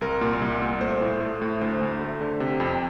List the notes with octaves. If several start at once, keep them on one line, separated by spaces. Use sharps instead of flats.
C2 A#4
A#2
C2
A#2
A3 C5
A2
A3
A2
D2 C5
D2
A3
D3
C3
F2